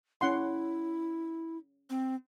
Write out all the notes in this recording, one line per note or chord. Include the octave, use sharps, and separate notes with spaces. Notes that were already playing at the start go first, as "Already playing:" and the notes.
C#4 E4 F#5 C6
C4